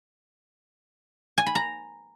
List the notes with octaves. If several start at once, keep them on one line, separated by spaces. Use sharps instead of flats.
G#5
B5
A#5